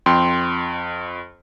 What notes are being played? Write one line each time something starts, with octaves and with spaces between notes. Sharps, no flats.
F2 G5 C6